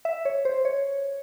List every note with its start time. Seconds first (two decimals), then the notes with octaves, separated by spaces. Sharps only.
0.05 E5
0.25 C#5
0.45 C5
0.65 C#5